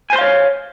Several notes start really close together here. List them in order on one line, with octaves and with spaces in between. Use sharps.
G#5 C5 C6 F5 C#5